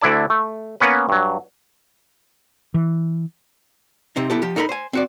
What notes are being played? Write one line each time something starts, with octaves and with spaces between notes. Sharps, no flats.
D2 D3 E4 D5 A5
A3
A#3 B3 C#4 B4
G2 F#3
E3
C3 C4 D#4
B3 E4 G4 A4
F3 G4
D#4 A4 A#4 A#5 B5
C5 G#5
C4 F#4 D5